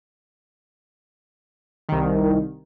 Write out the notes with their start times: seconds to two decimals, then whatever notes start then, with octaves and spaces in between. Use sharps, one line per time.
1.89 C2 D#3